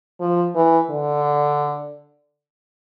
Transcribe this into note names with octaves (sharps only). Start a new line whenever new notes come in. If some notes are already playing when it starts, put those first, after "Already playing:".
F3
E3
D3